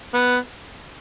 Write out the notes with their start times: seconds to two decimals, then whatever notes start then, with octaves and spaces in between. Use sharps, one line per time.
0.14 B3